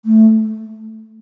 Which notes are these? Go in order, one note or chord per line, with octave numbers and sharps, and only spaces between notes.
A3